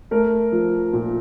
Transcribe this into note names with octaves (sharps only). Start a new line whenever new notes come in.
A3 A#4
F3
A#2